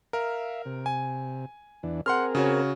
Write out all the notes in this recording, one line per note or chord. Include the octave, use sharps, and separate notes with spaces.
A#4 E5 F5
C3
G#5
E2 E3 D4
C4 G#4 A#4 F#5 C6 F6
C#3 F#4 C#5